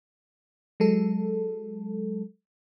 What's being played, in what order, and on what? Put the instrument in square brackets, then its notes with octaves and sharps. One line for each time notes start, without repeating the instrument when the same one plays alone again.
[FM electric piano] F#3 G#3 A4